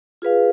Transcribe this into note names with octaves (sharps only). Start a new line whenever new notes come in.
F4 G#4 B4 F5